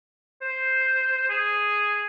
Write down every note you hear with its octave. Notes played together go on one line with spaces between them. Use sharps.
C5
G#4